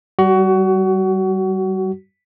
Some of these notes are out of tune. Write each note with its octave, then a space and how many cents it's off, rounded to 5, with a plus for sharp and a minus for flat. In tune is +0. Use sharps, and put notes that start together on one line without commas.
G3 -30 F#4 +25